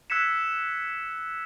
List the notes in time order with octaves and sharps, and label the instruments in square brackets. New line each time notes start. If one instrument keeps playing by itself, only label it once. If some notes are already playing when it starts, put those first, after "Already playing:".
[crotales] E6 F#6 G#6 B6 C#7 E7